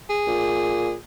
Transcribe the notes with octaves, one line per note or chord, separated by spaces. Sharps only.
G#4
A#2